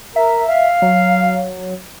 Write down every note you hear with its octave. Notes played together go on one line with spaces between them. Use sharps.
A#4 E5
F5
F#3